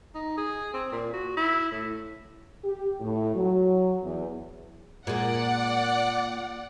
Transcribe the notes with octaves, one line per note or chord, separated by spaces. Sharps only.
D#4
G#4
C4
A#2
F#4
E4
A2
G4
A2
F#3
E2
A#2 G#3 D5 F#5